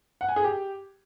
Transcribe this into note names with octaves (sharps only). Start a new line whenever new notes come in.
F#5
G#5
G#4
G4